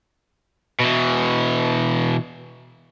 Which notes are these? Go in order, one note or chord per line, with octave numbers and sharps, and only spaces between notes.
B2 E3